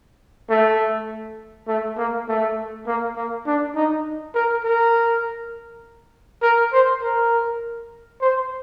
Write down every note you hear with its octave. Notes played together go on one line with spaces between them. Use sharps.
A3
A3
A#3
A3
A#3
A#3
D4
D#4
A#4
A#4
A#4
C5
A#4
C5